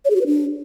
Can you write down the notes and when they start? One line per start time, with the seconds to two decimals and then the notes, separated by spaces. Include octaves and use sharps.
0.05 C#5
0.10 G#4
0.16 F#4
0.21 B4
0.26 D4